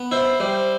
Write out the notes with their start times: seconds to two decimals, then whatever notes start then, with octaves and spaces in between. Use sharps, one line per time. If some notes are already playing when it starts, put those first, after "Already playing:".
Already playing: B3
0.12 E4 C5
0.40 G3 C5